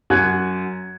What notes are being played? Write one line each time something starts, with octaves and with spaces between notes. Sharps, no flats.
F#2 F#4 G#5 F#6 G#6